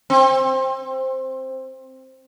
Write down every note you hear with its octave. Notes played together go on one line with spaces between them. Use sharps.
C4